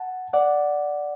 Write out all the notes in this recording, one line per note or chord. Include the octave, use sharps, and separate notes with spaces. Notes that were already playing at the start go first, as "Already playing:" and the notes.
Already playing: F#5 A5
D5 F#5